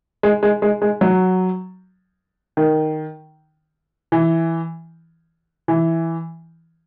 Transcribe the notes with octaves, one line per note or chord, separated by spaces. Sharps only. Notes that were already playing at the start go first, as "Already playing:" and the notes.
G#3
G#3
G#3
G#3
F#3
D#3
E3
E3